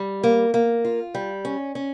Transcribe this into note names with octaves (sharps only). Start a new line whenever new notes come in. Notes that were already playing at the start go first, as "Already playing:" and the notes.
Already playing: G3
A#3
A#3
F4
G3
C#4
C#4